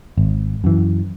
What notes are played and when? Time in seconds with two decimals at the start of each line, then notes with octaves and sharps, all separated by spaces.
0.18 G#1
0.64 F#2 E3